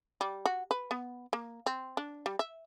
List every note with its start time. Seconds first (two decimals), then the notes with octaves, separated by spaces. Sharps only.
0.21 G3
0.46 F#4
0.71 B4
0.91 B3
1.33 A#3
1.66 C4
1.97 D4
2.26 G3
2.39 E5